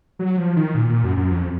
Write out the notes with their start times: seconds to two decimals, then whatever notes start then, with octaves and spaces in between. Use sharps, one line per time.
0.19 F#3
0.38 F3
0.56 D#3
0.75 A#2
0.89 A#2
1.04 F#2
1.17 F#2
1.31 F2